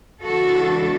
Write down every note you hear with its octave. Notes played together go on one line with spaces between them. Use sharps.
E2 C#3 E3 G#3 D4 F#4 A4